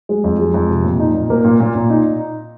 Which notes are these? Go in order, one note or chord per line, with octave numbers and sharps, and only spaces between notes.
G#3
F2
G#3
F2
C3
A#2
D#4
A#2
A#3
A#2
A#2
A#2
D#4